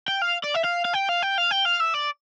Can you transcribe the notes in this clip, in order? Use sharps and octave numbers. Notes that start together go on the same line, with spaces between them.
G5
F5
D5
E5
F5
F5
G5
F5
G5
F5
G5
F5
E5
D5